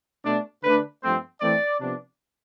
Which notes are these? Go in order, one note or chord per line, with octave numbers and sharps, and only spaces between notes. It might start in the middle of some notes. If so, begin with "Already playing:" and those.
B2 A3 D4
D3 A3 D4 B4
G2 F3 A3 C4 C5
E3 A3 C4 D5
C3 F3 B3 D4